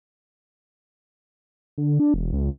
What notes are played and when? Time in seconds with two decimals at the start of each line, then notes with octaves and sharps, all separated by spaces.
1.78 D3
2.00 D4
2.14 E1
2.33 C#2